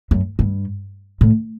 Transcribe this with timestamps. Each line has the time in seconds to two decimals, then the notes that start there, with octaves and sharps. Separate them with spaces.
0.11 F#2
0.39 G2
1.21 A2